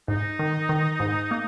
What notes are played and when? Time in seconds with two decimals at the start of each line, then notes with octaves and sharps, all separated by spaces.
0.08 G#2 D#4
0.39 D#3
0.69 D#3
1.00 G#2
1.31 A#3